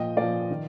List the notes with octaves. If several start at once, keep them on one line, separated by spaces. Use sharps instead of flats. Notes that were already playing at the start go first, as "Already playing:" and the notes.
Already playing: A#2 F3 D#5 G5
A#2 F3 D5 F5
D#3